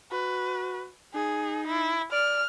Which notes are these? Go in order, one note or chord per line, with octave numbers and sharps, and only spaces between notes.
F#4 B4
D#4 G#4
E4
D5 F6